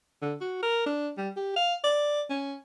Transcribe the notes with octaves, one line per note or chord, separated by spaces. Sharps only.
D3
F#4
A#4
D4
G3
G4
F5
D5
C#4